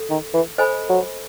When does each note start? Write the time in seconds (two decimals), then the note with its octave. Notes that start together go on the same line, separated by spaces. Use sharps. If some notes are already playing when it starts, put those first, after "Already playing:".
Already playing: A4
0.10 D#3
0.34 E3
0.58 A4 C5 D#5 G#5 B5
0.90 F#3